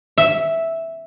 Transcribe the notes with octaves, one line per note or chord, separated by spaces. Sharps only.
E5